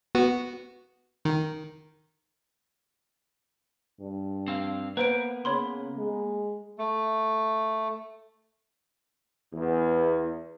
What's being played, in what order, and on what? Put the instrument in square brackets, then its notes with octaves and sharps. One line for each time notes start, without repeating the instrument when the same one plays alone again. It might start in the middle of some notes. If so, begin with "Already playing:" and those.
[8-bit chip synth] B3 F#4
D#3
[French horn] G2
[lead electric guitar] C4 F5
[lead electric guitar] A#3 B3 [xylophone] B4 C5 D7
[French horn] C#3 [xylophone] C#5 B5 C6
[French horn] G#3
[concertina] A3
[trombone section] E2